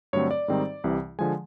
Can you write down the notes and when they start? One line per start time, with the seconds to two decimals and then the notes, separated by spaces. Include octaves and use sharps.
0.13 G2 D3 F#3 A3 C4 C#5
0.31 D5
0.48 G#2 D#3 G3 C4 D#4
0.84 C2 C3 E3
1.19 D3 F3 G#3 G#5